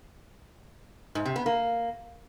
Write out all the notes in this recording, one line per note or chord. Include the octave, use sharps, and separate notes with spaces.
G#2
C3
B3
A#3